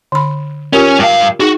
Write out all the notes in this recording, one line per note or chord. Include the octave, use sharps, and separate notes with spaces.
D3 B5
C#4 F4 G4 A#4
G2 F5
D#4 F#4 G#4